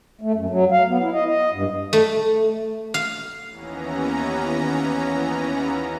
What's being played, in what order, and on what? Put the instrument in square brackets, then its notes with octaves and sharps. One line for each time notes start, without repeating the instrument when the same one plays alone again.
[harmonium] A3
F#2
F#3
F5
B3
E4
D#5
D#5
G2
[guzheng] A3
F5
[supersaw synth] D#2 E3 B3 C#4 A#5